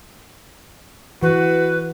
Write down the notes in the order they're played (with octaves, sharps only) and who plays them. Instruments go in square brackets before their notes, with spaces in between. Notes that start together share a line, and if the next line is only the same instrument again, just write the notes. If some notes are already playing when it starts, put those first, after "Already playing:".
[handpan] E3 [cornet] F#4 [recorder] B4